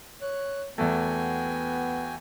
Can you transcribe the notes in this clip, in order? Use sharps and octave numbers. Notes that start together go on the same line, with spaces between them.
C#5 F#6
E2 A3 B3 F#4 G5 G#5